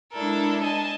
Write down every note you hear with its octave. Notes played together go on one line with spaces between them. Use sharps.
G#3 D4 E4 A4 A#4
D#5 G#5 A5